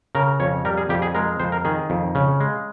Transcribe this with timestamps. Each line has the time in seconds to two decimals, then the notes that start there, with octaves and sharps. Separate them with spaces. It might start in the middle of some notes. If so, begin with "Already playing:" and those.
0.15 C#3 A#4
0.40 F2 C#5
0.65 G3 A#4
0.78 G#4
0.89 F2 G4
1.02 G#4
1.15 G#3 A#4
1.40 F2 C5
1.52 A#4
1.65 D#3 G#4
1.90 F2
2.15 C#3
2.40 G#3